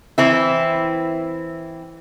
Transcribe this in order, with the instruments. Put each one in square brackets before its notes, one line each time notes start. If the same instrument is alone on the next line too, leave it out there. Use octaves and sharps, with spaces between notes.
[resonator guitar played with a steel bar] E3 C4 E4